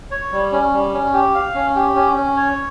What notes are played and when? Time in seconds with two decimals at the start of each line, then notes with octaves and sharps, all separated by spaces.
0.11 C#5
0.32 G3
0.52 C#4
0.73 G3
0.93 C#4
1.13 G4
1.35 F5
1.55 C#4
1.75 G4
1.96 C#4
2.16 C#4
2.36 C#5